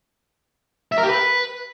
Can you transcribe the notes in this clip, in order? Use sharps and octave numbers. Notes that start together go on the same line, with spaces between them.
E5
A#4
G4
B4